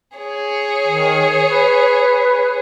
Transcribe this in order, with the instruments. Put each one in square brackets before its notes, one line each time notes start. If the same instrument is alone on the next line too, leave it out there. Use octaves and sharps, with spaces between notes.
[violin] G#4 C#5
[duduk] D#3
B4